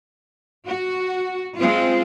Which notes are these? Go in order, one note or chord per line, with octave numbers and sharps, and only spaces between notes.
F#4
G#3 C4 F4